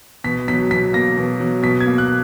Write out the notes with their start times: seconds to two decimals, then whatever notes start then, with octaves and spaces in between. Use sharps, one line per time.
0.24 B2 B6
0.48 F#3 B6
0.71 B2 B6
0.93 A#3 A#6
1.17 B2
1.40 F#3
1.63 B2 B6
1.80 G#6
1.86 A#3
1.98 F#6